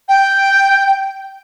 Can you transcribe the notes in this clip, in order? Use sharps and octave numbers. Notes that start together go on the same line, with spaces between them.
G5